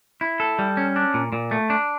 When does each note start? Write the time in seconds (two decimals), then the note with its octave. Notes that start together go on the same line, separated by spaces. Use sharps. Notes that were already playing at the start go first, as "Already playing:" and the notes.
0.21 E4
0.40 A4
0.59 G3
0.77 C#4
0.96 D4
1.14 A#2
1.33 A#2
1.51 A3
1.70 D4